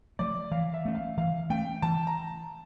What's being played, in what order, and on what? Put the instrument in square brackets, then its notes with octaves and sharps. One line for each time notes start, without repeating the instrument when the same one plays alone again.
[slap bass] F3 A3 [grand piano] D5
[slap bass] E3 [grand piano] F5
[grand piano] E5
[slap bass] A3 C#4
[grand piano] F5
[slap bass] E3 [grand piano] F5
[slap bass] A3 C#4 [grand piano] G5
[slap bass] E3 [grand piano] A5
[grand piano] A#5